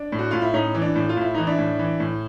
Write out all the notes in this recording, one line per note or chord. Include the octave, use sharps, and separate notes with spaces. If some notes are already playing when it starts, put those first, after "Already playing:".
Already playing: D4
A2
F#4
A2 F4
E4
A2 C#4 D#4
E3
D4
A2
F4
A2 E4
E3 D#4
D4 E4
A2
E3
A2